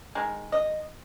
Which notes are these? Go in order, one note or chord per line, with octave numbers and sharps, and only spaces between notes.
D#3 G#3
D#5